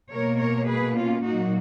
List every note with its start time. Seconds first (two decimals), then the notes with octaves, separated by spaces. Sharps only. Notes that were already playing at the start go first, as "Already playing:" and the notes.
0.11 B2 A#3 A#4 C#5
0.39 A#4 C#5
0.68 G#4 B4
0.96 C#4 F4
1.24 A#2 F#3 A#3 D#4 F#4